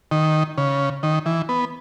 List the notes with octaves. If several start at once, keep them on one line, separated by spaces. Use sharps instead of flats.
D#3
C#3
D#3
E3
B3